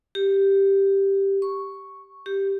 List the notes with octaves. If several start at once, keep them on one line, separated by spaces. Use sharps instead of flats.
G4
C#6
G4